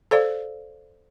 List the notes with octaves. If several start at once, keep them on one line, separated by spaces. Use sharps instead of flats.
A4 C5 D5 F5